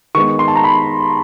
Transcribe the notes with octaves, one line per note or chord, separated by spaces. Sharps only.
D#3 G#3 B3 C#6
C6
A5
A#5
B5